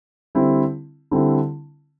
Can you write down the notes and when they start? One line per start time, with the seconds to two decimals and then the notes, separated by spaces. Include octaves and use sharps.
0.35 D3 G3 C4 E4
1.11 D3 G3 C4 E4